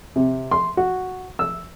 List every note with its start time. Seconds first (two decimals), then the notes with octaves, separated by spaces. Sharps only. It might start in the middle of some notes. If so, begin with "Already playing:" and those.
0.16 C3
0.51 C6
0.77 F#4
1.39 E6